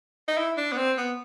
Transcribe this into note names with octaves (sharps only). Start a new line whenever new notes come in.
D#4
E4
D4
B3
C4
B3